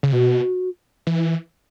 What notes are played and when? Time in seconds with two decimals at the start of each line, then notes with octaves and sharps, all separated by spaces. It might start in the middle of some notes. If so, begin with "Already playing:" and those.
0.03 C#3
0.13 B2 F#4
1.07 E3